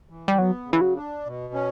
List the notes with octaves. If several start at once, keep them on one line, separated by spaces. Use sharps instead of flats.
E3
G3
F#3 B3
C#3
E3
F#3
D4
B2
C#4